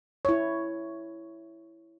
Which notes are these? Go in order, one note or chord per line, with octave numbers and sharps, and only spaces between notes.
E4 C#5